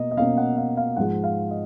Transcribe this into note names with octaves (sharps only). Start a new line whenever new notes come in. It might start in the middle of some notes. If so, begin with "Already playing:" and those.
Already playing: B2 A#3 D#5
D#5
B2 A#3 C#4 F5
F#5
F5
F5
G#2 F3 G#3 F#5
F5
D#5